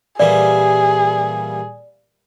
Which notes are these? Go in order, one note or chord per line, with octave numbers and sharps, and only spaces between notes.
A#2 E3 G3 G#4 D5